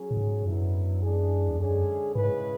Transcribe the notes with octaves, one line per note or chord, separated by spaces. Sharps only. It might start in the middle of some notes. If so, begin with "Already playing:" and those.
Already playing: F#3 C#4 G#4
A2
G#2
F#2 D3 F#3 B3 E4
E3 G#3 D4 G#4
E2
F#2 D3 G#3 C#4 G#4
G#2 C#3 G#3 C#4 E4 B4